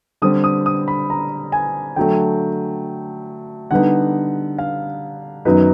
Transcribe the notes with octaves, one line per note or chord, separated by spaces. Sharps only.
D3 G3 C4 D#6
D#6
D#6
B5
A#5
G#5
D3 F#3 A3 G5
D3 G3 B3 D#4 F#5
F5
F#2 D#3 F#3 B3 D#4 B4